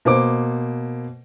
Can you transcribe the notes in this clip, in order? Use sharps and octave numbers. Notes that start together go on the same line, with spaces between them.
B2 A#3 C5 D6